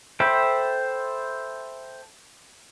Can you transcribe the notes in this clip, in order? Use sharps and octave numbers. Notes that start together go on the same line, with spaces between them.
A4 C5 E5 G5 B5